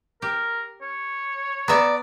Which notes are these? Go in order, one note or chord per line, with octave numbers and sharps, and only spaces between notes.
G4 A#4
C#5
B3 D5 E5 A#5